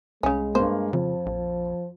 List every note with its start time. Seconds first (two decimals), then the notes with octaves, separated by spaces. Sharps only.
0.23 C2 C#3 G#3 C#4
0.55 G2 A#3 C5
0.93 F2 C#3 F3
1.26 A#1